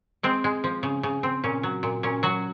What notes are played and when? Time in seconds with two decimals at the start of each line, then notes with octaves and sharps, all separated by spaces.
0.23 G#3 C4
0.44 G#3
0.64 F3
0.83 C#3
1.03 C#3
1.23 C4
1.44 A#2 C#4
1.63 F#3
1.83 A#2
2.03 A#2 C#4
2.23 F#3 F#4